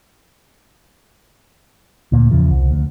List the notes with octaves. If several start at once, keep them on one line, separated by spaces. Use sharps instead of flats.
D2 A#2 A#3
E2 C#3 F3
C2
D2